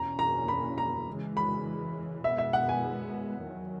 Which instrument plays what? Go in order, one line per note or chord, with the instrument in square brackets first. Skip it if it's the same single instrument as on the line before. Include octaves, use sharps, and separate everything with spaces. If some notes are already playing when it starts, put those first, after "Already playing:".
Already playing: [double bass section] E2 B2 A#3 C#4 [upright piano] A#5
[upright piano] A#5
B5
A#5
[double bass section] C#3 E3 G#3
[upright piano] B5
[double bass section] B2 G#3 B3 [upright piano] E5
[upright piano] E5
F#5
G#5
[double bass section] E2 D#3 F#3